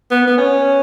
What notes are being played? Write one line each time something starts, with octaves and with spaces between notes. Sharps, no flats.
B3
B3
C#4